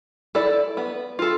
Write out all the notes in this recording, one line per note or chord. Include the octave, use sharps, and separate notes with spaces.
E4 A4 D5
B3
F4 A4